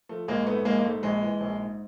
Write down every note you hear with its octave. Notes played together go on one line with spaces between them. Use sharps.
F3 A3
A#1 G#3 A#3
G#2 A3 B3
A#1 G#3 A#3
A#3
G#2 A3
A#1 G#3
E3
A#1
G#2